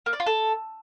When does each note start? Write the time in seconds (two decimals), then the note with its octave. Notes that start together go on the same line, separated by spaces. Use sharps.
0.06 A#3
0.13 D5
0.20 F4
0.26 A4